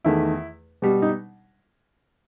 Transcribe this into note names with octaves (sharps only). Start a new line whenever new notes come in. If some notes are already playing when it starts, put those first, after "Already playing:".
E2 D#3 A3 E4
B2 G3
D#4